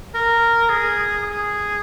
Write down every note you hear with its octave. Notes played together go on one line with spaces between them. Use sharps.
A#4
G#4
G#4